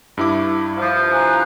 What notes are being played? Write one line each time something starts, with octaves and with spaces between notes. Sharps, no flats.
G2 E4 D6
F3
G#5 A#5 F#6